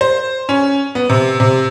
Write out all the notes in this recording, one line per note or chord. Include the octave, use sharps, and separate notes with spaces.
C5
C#4
B3
C3
C3